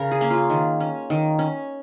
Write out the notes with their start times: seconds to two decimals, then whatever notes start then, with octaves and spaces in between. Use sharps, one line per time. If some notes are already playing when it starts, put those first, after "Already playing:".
Already playing: C#3 A#4 C#5
0.11 G#4
0.21 A#3 C#4
0.30 F4
0.50 D#3
0.80 C#4
1.10 D#3
1.39 C#4